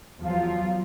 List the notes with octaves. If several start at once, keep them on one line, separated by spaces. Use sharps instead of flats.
E2 F3 F#3 F4